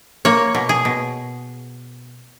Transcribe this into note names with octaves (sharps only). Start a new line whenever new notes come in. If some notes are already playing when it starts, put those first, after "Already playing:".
A#3 C#5
B2
G#4
B2